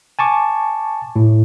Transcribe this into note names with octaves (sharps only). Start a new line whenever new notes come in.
G#5 A5 C#6 D6
A2